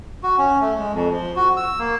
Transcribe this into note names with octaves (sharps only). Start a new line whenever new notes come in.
F#4
C#4
A3
G#3
F2
F3
F#4
E6
A#3